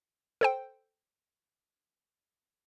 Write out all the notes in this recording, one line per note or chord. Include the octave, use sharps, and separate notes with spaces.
A4 C5 G5